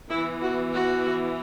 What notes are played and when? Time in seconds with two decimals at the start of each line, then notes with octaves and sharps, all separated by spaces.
0.10 E3 B3 E4
0.42 F#4
0.73 F#4